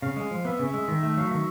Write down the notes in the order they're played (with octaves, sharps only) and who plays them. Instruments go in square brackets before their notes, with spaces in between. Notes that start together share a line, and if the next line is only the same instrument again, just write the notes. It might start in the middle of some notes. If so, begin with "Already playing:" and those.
[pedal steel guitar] C#3 [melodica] F5
[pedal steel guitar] G#3
F3
[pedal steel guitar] B3 [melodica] E5
[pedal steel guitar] C#3
[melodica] E5
[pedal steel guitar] G#3
D#3
A3
[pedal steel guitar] F#3 [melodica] F5
[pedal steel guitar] D#3 [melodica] E5